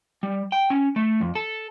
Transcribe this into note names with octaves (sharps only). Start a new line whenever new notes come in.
G3
G5
C#4
A3
F2
A4